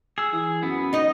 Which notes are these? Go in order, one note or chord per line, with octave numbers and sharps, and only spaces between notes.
G#4 E6
E3
F#2 B3
D#4 D#5